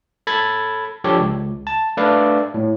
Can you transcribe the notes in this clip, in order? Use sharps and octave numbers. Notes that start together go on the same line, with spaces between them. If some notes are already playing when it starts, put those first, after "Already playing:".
A4 B5 G#6 A6
F3 D4 G4 A4 C#5 D5
C#2
A5
A3 D4 A4 B4 D5 F5
A2